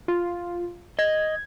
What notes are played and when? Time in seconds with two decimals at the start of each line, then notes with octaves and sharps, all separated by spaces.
0.08 F4
0.99 D#5 G#6